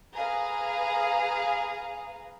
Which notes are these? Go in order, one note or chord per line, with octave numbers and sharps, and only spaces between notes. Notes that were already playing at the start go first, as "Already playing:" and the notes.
G#4 B4 F5 A#5